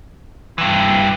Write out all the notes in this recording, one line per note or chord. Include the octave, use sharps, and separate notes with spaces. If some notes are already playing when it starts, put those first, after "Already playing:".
G2 E3